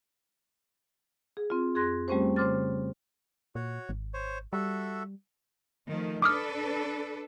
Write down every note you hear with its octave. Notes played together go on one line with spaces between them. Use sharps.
G#4
C4 F4
F2 G#4 C6 F#6 G#6 A#6
G3 A3 C4 C#4 G4 C5
C#3 C5 C6 D6 F6 A6
A#2 F#4 C#5
G#1
C5 C#5
G3 F#4 A4 E5
D#3 F3 A3
D4 A4 B4 D6 D#6 F6